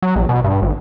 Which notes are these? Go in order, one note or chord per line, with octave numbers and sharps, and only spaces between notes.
F#3
A#1
B2
G2
G#1